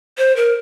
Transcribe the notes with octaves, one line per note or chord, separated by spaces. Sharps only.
C5
A#4